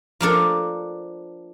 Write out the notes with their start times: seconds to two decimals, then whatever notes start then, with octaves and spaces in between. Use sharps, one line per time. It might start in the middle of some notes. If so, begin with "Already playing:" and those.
0.21 F3 A#3 D4 A4